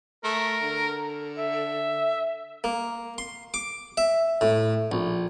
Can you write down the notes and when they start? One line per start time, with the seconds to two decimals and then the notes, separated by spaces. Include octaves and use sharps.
0.24 A3 A#4
0.62 D3
1.38 E5
2.64 A#3
3.18 C6
3.54 D6
3.97 E5
4.41 A2
4.92 A#1